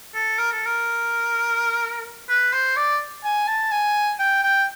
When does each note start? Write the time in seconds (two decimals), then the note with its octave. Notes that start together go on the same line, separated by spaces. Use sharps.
0.15 A4
0.38 A#4
0.52 A4
0.65 A#4
2.29 B4
2.53 C5
2.76 D5
3.24 G#5
3.47 A5
3.71 G#5
4.19 G5
4.43 G5